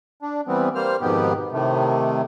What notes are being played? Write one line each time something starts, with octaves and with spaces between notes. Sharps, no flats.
D4
E3 G3 B3 C4
G3 A#3 C5 F6
F2 G#2 B2 D#3 B3 G4
A2 C3 D#3 A3